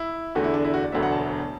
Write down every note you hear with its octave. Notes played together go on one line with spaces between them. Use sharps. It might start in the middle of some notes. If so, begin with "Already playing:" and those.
Already playing: E4
E2 D3 A3 F#4
E4
D4
E4
F#4
D5
E1 D2 D3 F#3 B3 E5
F#5
A5